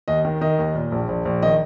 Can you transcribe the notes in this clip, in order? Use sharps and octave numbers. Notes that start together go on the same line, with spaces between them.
D#2 D#5
D#3
D#3 D#5
D#2
A#2
A#1
A#1
A#1
D#3 D#5